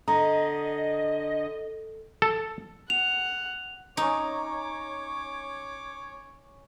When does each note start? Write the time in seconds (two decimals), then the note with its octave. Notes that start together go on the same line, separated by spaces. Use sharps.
0.08 D3 D#5 A#5
2.22 A4
2.90 F#5 F7
3.97 C#4 D#4 C#5 A#5 D6